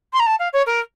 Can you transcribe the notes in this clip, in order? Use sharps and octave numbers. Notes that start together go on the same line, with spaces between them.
C6
A#5
A5
F5
C#5
A#4